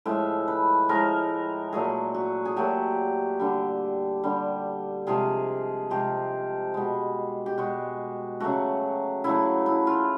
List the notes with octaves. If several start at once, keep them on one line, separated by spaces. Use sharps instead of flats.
A2 F3 G#3 E5
B4
A2 F3 G#3 A#4
A#2 F#3 A3 G#4
F#4
G#4
A#2 F#3 A3 G4
D3 G3
D3 G3
C3 F3 G#3 G#4
C3 F3 G#3 G4
B2 G#3
G4
B2 G#3 F#4
C#3 F#3 A3 F#4
C#3 F#3 A3 E4
E4
F4